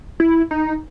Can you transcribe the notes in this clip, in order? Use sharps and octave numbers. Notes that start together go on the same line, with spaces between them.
E4
D#4